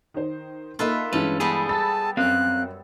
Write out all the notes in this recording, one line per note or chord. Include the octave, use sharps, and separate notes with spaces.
D#3 C5
A#3 D#4 F4 A4 B4 E5
G2 E3 G#3 C#4 A4 B4
G3 B3 G#4 A4
A5 B5 E6 A6
F#2 C4 F5 F#6